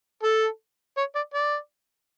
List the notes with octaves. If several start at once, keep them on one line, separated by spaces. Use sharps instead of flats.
A4
C#5
D5
D5